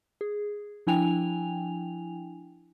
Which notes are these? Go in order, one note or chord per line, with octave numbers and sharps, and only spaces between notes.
G#4
F3 D4 E4 G5 G#5 F7